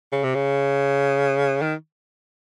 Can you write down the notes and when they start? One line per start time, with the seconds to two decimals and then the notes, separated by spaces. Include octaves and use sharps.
0.12 C#3
0.23 C3
0.35 C#3
1.62 D#3